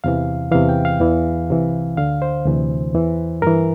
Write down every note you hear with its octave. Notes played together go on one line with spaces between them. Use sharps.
E2 C3 E3 F5
E2 C3 E3 F5
G5
F5
E2 E3
C2 C3 E3
D2 D3 F5
C5
D2 C3 E3
E2 E3
G2 E3 A#4